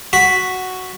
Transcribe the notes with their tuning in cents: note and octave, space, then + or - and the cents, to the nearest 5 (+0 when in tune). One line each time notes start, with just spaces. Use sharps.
F#4 +0 B5 +0